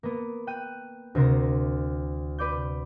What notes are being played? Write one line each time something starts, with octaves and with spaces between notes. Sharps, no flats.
A#3 B3
G5 F#6 D#7
D2 C3 A#4 C6 A#6
B4 D5 D6 G6